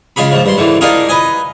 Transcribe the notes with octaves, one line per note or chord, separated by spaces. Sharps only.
C#3 G#3 F4 G#4 B5
G#2 F3
G2 C6
G#2 D3 E3
D4 D#4 F4 G#4 A#4
B4 D#5 G#5